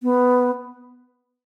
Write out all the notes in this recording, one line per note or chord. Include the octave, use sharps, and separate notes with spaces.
B3